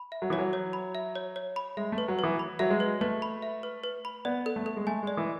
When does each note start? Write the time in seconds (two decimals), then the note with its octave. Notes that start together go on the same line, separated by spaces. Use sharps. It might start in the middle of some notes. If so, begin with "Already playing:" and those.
Already playing: B5
0.12 E5
0.22 F#3
0.30 E3 C#5
0.38 F#3
0.53 C#5
0.73 B5
0.95 E5
1.15 C#5
1.36 C#5
1.56 B5
1.77 G#3 E5
1.92 A3
1.98 B4
2.08 F#3
2.19 E3 B4
2.39 B5
2.59 F#3 E5
2.70 G#3
2.80 B4
3.01 A3 B4
3.22 B5
3.42 E5
3.63 B4
3.84 B4
4.05 B5
4.25 B3 D5
4.46 A4
4.56 A3
4.66 A4
4.77 G#3
4.87 A3 G#5
5.03 G#3 D5
5.17 E3